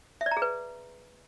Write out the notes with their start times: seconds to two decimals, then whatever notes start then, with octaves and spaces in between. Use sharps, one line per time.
0.21 E5
0.26 D5
0.31 A#5
0.37 G#4
0.42 B4